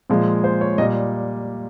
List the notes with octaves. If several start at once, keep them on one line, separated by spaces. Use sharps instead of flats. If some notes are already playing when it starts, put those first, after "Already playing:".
A#2 F3 G#3
C5
C#5
A#2 G3 D#5